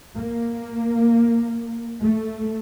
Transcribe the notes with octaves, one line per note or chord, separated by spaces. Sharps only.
A#3
A3